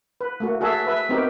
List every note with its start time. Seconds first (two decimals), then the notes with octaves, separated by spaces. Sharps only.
0.21 B4
0.40 A3 A#3 F#4
0.61 F#4 G#4 A4 E5
0.87 B4 E5
1.09 B3 C4 D#4 F#4 G4 A#4